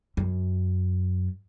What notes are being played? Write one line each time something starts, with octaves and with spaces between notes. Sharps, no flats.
F#2